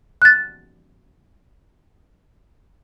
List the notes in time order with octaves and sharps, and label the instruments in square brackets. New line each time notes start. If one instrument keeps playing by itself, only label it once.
[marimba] F#6 A6